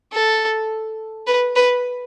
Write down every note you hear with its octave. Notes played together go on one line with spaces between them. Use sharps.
A4
B4
B4